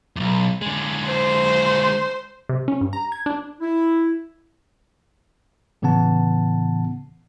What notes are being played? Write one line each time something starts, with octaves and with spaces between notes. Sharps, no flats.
B1 E2
D3 G#3
C5
C3
C#4
G2
A#5
G#6
D4
E4
A2 C#3 E3 B3 F#5 A5